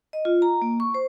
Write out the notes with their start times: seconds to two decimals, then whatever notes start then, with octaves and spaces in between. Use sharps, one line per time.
0.13 D#5
0.25 F4
0.42 A#5
0.62 A#3
0.80 C#6
0.94 C5